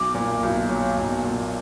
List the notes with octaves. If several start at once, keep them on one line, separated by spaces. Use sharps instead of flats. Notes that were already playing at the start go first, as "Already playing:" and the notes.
Already playing: B1 D6
A#2
B1
F#3
B1
A#2